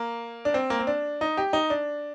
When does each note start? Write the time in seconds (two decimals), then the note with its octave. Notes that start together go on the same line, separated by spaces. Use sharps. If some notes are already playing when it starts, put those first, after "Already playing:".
Already playing: A#3
0.45 D4
0.54 C4
0.70 A#3
0.79 C4
0.87 D4
1.21 D#4
1.37 G4
1.53 D#4
1.70 D4